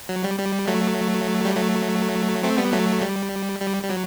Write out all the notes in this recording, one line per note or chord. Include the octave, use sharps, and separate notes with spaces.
F#3
G3
G3
F#3 A3
G3
F#3 A3
A3 C4
G3 B3
F#3 A3
G3
G3
G3
F#3